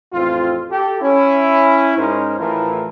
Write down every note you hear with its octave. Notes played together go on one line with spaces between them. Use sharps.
A1 F2 C4 F4
G4 A4
C#4 E4
G#2 C#4 D#4 A#4 C5
A1 A2 E3 F3 E4 A#4